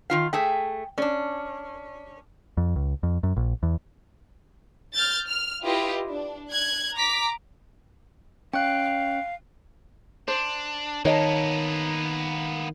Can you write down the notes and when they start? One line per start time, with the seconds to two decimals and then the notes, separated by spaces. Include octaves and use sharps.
0.10 D#3 F4 F5
0.33 A3 G#4 E5 G5
0.98 C#4 D4 D5
2.57 F2
2.76 C#2
3.03 F2
3.23 F#2
3.36 A#1
3.63 E2
4.93 F6 G6 A6
5.26 F6
5.63 E4 F4 G4 B4 D#5
6.08 D4
6.50 F#6 G#6
6.95 A#5 D6 B6
8.53 C#4 C#5 D#5 F5 G5 F#6
10.28 D4 C5
11.05 D#3 A#3 B3 C#5 D#5 A5